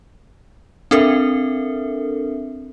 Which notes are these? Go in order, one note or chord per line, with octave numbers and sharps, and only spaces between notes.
C4 D4 A4 A#4 E5